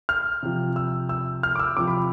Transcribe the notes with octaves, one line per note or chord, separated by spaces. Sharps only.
F6
C3 F3
E6
E6
F6
D6
E6
C3 F3 D6
B5